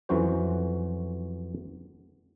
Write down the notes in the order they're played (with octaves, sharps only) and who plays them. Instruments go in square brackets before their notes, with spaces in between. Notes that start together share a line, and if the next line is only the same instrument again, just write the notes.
[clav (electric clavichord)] F2 E3 F#3 C#4 F#4 C5